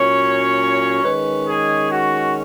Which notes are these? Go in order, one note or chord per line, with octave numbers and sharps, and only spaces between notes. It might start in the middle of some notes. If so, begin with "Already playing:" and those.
Already playing: A#2 F#3 C#4 C#5
D#3 G#3 C#4 B4
G#4
F#4